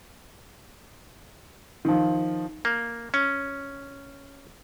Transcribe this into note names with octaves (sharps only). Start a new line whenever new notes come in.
D#3 F3
A#3
C#4